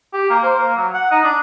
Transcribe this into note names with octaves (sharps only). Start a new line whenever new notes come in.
G4
A#3
C5
A#3
F#3
F#5
D#4
D4